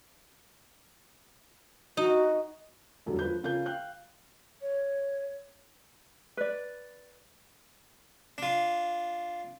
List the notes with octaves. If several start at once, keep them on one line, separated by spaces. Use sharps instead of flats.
D#4 F#4
E1 F#2 D3 G3 A4
F3 B4 G6
C#3 F4 A#4 G6
F5 G5 F#6 G6
C#5
B4 D5
D4 F4